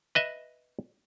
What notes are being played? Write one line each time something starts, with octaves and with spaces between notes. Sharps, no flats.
B4 D#5 E5